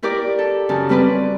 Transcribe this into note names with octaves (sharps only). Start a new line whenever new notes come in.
E4 G4 A#4 D5 D6
A4
F#2 C#3 A5
G3 C4 B4 D5